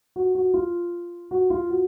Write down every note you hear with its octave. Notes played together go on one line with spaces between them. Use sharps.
F#4
F#4
F4
F#4
F4
F#4